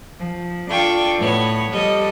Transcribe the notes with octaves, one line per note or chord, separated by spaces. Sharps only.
F3
D4 F4 A4 G5 C#6
A2 B3 C#5
F3 G3 A4 D#5